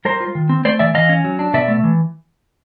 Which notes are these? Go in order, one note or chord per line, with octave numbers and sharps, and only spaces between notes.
G3 A#4 C5
F4
D#3
C4
A3 C5 D5
E3 D5 E5
E3 D#5 F5
C#4
F#3
D4
B2 D5 E5
A3
E3